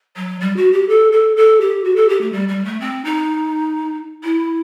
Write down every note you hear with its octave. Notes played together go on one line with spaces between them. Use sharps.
F#3
G3
F#4
G4
A4
A4
A4
G4
F#4
A4
G4
A3
G3
G3
A3
C4
D#4
E4